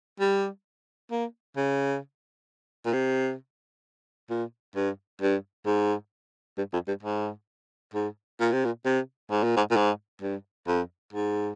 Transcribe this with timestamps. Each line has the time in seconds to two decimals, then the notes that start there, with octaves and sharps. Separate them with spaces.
0.20 G3
1.11 A#3
1.57 C#3
2.85 A#2
2.93 C3
4.30 A#2
4.76 G2
5.21 G2
5.66 G#2
6.58 G2
6.73 F2
6.88 G2
7.03 G#2
7.94 G#2
8.40 A#2
8.52 C3
8.65 A#2
8.85 C3
9.31 G#2
9.44 A#2
9.57 G#2
9.71 A#2
9.76 G#2
10.22 G2
10.67 F2
11.13 G#2